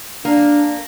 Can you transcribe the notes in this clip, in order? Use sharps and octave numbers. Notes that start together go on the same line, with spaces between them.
A#3 D4